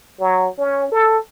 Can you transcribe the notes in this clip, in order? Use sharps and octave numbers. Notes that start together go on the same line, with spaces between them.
F#3
C#4
A4